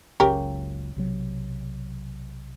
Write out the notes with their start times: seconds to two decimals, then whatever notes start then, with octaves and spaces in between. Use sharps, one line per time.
0.20 F#1 C#2 F#2 C#3 G4 A#4
0.96 B1 C3 F#3